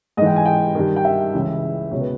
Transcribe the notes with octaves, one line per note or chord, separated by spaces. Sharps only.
G#2 E3 D#5 G5
G#5
G5
G2 D#3
G5
E5
C#2 C#3 E3
C#2 B2 C#5
B4